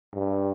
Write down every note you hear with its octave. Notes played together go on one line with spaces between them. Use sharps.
G2